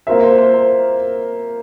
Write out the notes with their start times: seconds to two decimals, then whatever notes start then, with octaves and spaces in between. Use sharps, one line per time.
0.07 A#3 F4 A#4 C5 E5
0.23 C5
0.38 C5
0.54 C5